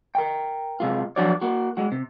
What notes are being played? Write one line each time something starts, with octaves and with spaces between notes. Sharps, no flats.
A#4 G5
C3 G#3 F4
F3 F#3 D4 F#4 C#5 D5
A#3 F#4
G#3 F#4
C3